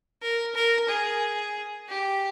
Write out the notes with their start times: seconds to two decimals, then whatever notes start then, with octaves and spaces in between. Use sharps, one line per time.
0.22 A#4
0.55 A#4
0.89 G#4
1.89 G4